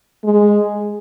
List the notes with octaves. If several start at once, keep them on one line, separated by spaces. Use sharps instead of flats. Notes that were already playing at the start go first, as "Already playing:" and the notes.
G#3